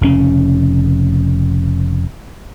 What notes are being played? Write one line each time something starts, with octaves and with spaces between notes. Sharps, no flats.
F1 C#3 C#4